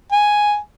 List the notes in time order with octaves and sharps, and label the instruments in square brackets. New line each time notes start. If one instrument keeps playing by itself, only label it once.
[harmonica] G#5